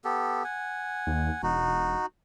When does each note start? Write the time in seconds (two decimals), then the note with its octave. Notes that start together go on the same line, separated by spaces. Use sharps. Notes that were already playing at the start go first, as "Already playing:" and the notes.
0.04 B3 G4 A4
0.44 F#5 G#5
1.07 D#2
1.43 E1 D#4 F#4